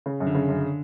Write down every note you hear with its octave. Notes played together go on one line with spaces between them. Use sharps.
C#3
F#2
D3
C#3
F#2